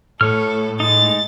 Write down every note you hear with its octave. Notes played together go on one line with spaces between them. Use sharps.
A2 A3 A4 C#5 F6
G#3 D#4 A6